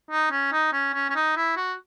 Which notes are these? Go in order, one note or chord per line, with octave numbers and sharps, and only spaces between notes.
D#4
C#4
D#4
C#4
C#4
C#4
D#4
E4
F#4